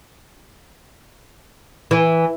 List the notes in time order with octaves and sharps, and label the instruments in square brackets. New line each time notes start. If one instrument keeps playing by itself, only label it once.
[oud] E3